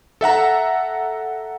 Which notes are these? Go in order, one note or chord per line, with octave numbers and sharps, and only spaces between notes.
A4 E5 F#5 A#5